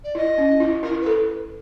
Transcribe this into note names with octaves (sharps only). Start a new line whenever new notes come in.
D5
E4 D#5
C#4
E4
E4 A#4
B4
A4